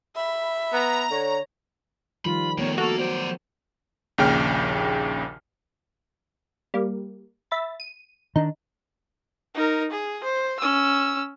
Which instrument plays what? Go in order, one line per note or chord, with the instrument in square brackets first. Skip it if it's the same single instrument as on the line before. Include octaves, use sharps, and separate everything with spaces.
[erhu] E5 [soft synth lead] B5
[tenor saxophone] B3 [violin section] A#5
[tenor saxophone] D3 [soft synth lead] C#5
[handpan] D#3 F3 G3 [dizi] F4 [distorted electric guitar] B5
[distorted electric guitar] E2 D#3 [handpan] A3 B3 [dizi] C#5
[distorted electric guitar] A#3 [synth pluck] F#4 [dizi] A4
[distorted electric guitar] F#3 D5 [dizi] C5
[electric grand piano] A#1 D#2 C#3 G5 F6
[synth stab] G3 A#3
E5 B5 A6
D#7
[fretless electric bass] D#3 D4 [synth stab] D#4
[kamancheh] D#4 A#4
G#4
C5
C#4 E6